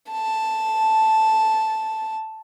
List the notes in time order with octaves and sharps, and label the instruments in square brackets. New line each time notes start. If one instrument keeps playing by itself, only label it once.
[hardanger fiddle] A5